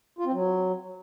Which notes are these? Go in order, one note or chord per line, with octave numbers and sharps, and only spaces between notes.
F4
C4
F#3